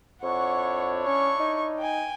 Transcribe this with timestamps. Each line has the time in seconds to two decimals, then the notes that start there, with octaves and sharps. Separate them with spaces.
0.23 F2 D4 E4 C#5 F#5 C#6
1.06 C#4 C#6
1.40 D#4
1.80 G5 G#5